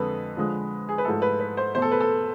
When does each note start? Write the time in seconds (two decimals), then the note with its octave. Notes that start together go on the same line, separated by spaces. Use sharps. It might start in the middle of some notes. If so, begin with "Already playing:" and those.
Already playing: F2 D3 G#3 A4 B4
0.37 D3 F3 G#3
0.89 G#4
0.98 B4
1.05 G#2 F3 A3 E4 A4
1.22 B4
1.40 B4
1.57 C5
1.74 E2 B2 A3 C5
1.82 A4
1.92 B4
2.01 A4